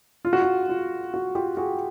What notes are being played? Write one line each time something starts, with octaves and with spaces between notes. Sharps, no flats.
F4
F#4
F4
F4
F#4
F4 G4
F#4 G#4